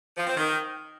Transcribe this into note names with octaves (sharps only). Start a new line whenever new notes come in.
F3
C4
D#3